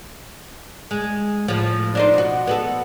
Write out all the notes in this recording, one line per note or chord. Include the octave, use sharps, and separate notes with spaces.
G#3
A2 F3
D4 D#4 C5
B2 F#4
B3 F#4 A4